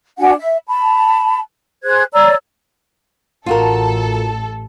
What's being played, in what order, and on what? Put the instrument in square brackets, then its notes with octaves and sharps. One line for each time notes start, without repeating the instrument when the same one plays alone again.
[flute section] D4 F#4 F#5 G#5
E5
A5 B5
G#4 C5 F#6 G#6
C#5 D5 A#5 E6
[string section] A1 A4 [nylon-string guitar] F4 F#4 A#4